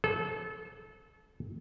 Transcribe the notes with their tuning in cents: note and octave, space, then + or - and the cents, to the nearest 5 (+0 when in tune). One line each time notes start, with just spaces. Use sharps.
A4 -30